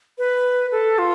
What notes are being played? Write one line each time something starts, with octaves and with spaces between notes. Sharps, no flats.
B4
A4
F4